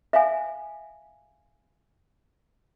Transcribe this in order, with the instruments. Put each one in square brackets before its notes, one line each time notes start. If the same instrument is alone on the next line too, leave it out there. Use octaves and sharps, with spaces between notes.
[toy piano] E5 F5 G#5